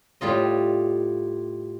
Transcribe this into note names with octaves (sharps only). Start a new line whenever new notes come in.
A2 G3 F4 D#5